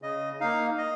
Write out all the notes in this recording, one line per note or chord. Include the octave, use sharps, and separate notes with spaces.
C#3 D#5
A#3 D#4 F5
D#5